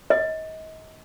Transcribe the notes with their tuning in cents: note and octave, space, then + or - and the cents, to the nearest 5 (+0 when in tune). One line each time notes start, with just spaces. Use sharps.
D#5 +30